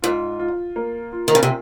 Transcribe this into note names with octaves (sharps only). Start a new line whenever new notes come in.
G#2 F4
F4
A#3
F4
D#3
C#3
C3